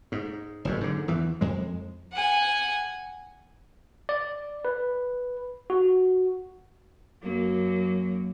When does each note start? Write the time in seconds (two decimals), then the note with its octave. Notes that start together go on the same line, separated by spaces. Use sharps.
0.12 G#2
0.65 F#1 F#2 A2
0.81 G#2 D3
1.08 E2 E3
1.41 F2 G#3
2.12 F#5 G#5
4.09 D5
4.65 B4
5.70 F#4
7.22 F#2 F#3 A#3